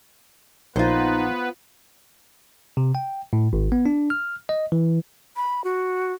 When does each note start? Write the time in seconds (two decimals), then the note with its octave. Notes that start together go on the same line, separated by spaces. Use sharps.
0.76 A#1 B3 D#4 F4 B4 C5
2.77 C3
2.95 G5
3.33 A2
3.53 G#1
3.72 B3
3.86 D4
4.10 F6
4.49 D#5
4.72 E3
5.36 B5
5.64 F#4